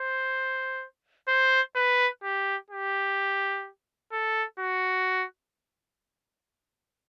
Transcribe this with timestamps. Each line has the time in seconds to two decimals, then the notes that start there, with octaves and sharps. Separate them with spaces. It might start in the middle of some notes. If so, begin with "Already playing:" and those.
Already playing: C5
1.28 C5
1.75 B4
2.23 G4
2.70 G4
4.12 A4
4.59 F#4